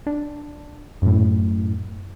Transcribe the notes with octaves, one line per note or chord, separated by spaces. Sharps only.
D4
F#2 A2